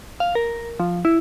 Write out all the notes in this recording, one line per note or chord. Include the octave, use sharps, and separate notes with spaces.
F5
A#4
F3
E4